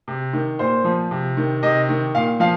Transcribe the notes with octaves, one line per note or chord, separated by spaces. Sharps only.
C3
D#3
A#2 C5
F3
C3
D#3
C3 D#5
D#3
A#2 F5
F3 F5